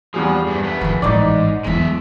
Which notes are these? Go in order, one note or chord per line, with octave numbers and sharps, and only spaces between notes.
E2 F3 G3 G#4
G2 A3
A3 B3
D#3 F3
A1 G#2 E3 D#4 D5
E2 F#3 G#3 E5